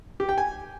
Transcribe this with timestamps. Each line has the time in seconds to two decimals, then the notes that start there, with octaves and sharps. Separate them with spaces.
0.20 G4
0.29 G5
0.38 G#5